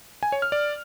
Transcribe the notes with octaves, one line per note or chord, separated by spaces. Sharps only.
G#5
C#5
F6
D5